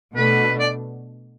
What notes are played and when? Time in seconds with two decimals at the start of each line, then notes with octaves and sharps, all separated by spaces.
0.16 B2 A3 D4 B4
0.59 D5